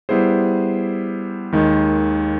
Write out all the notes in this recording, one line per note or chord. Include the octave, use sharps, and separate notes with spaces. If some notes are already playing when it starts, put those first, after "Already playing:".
G3 B3 E4 G#4 C5
D#2 D#3 G#3